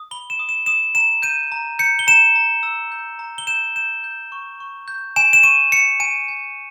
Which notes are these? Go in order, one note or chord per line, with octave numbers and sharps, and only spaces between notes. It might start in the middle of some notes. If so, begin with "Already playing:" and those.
Already playing: D#6
B5 G7
E7
D#6
E7
D#6 E7
A#5 E7
G6 D#7
A#5
G6 C#7
G7
A#5 E7
A#5
E6
G6
A#5
G7
G6 E7
G6 E7
G6
C#6
C#6
G6
G#5 E7
E7
C#6 D#7
G#5 C#7
G#5 D#7
G#5